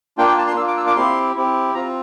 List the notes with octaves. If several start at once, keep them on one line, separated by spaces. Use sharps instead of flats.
A#3 D4 F4 G5
G5
A5
C6
A#3 D4 F4 E6
D6
E6
D6
C4 E4 G4 C6
C4 E4 G4
C4 F4 A#5